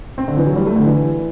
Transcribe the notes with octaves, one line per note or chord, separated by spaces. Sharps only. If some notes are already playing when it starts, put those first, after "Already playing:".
C4
D3
E3
F#3
G3
A3
D3
E3